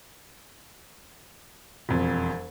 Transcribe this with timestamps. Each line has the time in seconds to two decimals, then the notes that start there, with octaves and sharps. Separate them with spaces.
1.89 E1 F2